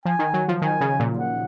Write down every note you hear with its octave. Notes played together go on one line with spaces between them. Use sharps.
F3 G#5
D#3
F#3
F3
D#3 G#5
C#3
A#2
F#5